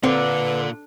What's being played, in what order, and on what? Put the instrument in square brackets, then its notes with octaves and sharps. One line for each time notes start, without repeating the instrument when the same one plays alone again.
[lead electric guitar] A#2 F4 [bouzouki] D3 [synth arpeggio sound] C4 [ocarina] B4